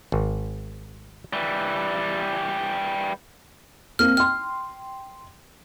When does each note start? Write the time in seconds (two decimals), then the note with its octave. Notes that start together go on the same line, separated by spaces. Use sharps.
0.12 G#1
1.33 E3 G3
3.99 A#3 C4 A#4 F6
4.17 G5 C6 F6